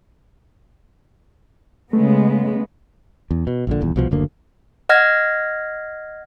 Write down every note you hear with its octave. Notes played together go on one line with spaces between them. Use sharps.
C#3 G#3 A3 B3
E2
B2
A#1 A#2 D3
D#1 E2
C2 B2 F3
F#1 D2 D3 A#3
D#5 F#5 F6 G#6 A#6